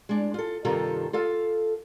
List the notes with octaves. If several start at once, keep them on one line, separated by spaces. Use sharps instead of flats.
G#3 D4
F4 A4
G2 C3 D#3 F4 A4 A#5
F4 A4 F5